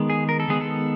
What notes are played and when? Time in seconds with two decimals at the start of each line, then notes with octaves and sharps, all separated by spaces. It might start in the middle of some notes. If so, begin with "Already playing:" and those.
Already playing: D#3 G#3 B3
0.10 G#4
0.29 A#4
0.40 A4
0.48 D#3 G#3 B3 G#4
0.61 A4